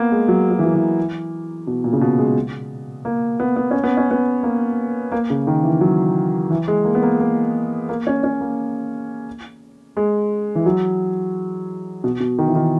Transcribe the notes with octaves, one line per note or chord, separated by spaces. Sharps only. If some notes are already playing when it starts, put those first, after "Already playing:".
Already playing: A#3 B3
G#3
F#3
F#3
E3
F#3
E3
B2
A#2
C#3
B2
G#3
A#3
B3
B3
C#4
B3
C#4
B3
A#3
A#3
C#3
D#3
E3
F#3
E3
G#3
A#3
B3
A#3
A#3
A#3
C#4
C#4
A#3
G#3
E3
F#3
B2
B2
D#3
E3
D#3